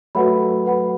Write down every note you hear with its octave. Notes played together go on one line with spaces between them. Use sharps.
F#3 A3 F#4 B4 F#5 B5
F#4 B4 F#5 B5